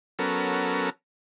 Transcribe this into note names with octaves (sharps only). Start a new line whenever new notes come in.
F#3 B3 C#4 A4 A#4